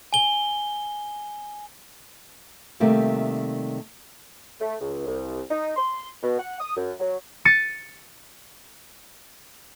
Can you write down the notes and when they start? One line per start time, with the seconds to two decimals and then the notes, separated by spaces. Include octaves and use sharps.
0.13 G#5 G7
2.80 C3 D#3 G3 A3 A#3
4.60 A3
4.80 C#2
5.07 C2
5.50 D#4
5.77 C6
6.23 B2
6.39 F#5
6.60 D#6
6.76 F#2
7.00 F#3
7.45 A6 C#7 D#7